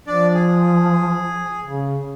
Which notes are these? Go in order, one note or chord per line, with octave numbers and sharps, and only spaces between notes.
F3 D4 D5
G#4
C#3